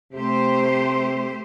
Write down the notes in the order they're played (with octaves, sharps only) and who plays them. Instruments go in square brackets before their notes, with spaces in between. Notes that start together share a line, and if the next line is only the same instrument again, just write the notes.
[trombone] C3 [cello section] A3 G4 C5